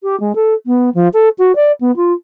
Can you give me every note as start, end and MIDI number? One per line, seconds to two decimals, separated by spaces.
0.03 0.18 67
0.20 0.35 56
0.35 0.54 69
0.66 0.90 59
0.94 1.08 53
1.13 1.29 69
1.38 1.55 66
1.55 1.72 74
1.80 1.94 59
1.96 2.12 65